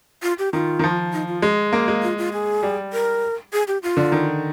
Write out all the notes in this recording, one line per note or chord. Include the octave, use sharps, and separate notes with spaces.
F4
G4
D#3 F4
D#3
F3
D#4
F4
G#3
A#3
G#3
F4
F4
G#4
G3
A#4
G#4
G4
F4
D3
D#3